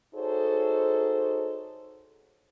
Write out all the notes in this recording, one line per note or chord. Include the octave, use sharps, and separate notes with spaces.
D#4 F#4 G#4 A4 C5 C#5